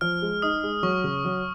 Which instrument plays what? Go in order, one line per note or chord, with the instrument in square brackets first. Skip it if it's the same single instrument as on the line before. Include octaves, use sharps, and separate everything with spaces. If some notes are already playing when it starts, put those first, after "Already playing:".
[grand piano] F3 [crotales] F6
[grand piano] G#3
[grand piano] D#4 [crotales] D#6
[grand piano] G#3
[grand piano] F#3 [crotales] C#6
[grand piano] C#3
F#3